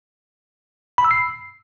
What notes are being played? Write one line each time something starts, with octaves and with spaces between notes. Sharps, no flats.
B5
E6
C7